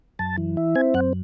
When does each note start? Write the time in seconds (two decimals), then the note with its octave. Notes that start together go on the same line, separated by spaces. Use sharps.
0.19 F#2 A5
0.37 E3
0.57 E4
0.75 C4 G#5
0.94 F#2 F#5